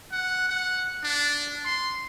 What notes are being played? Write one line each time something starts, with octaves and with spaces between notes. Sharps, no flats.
F#5
F#5
D4
C6